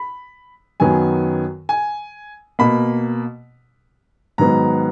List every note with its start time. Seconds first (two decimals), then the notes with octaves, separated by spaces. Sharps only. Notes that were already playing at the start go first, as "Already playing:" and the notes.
Already playing: B5
0.80 F#2 D#3 F#3 B3 G#5
1.69 G#5
2.59 B2 A#3 B5
4.38 G#2 D#3 F#3 B3 A#5